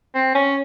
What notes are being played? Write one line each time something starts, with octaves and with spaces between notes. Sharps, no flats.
C4
C#4